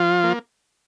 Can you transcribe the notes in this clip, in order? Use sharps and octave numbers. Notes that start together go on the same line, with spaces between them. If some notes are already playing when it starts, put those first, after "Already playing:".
Already playing: F3 F4
A#3